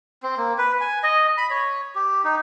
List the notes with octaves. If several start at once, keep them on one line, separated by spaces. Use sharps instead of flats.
C4
A#3
B4
G#5
D#5
B5
C#5
G4
D#4